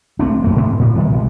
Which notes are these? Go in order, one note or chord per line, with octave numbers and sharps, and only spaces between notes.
D1 A3 C4 D4
F2 A3 A#3
G#2 B2
A2
D#3 G3 G#3 B3
C2 B2 G#3